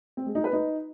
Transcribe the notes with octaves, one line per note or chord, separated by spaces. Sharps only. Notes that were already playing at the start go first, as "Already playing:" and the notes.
C4
G#3
D#4
B4
D#4